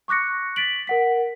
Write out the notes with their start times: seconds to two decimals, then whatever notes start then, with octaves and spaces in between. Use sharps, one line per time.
0.08 C#6 D6 F#6 A#6 C#7
0.56 A6 B6 D7 F#7
0.87 A#4 F#5 B6